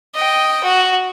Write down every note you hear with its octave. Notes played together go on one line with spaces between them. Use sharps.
D#5 G5
F#4